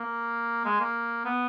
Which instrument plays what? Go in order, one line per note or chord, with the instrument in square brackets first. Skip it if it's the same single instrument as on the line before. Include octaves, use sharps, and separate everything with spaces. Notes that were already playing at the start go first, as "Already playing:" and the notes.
Already playing: [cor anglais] A#3
G#3
A#3
B3